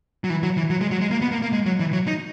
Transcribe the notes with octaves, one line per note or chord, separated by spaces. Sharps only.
F#3
E3
F#3
E3
F#3
G#3
F#3
G#3
A#3
B3
A#3
A#3
G#3
F#3
E3
F#3
D#4